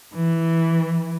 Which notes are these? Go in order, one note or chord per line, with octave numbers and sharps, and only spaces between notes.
E3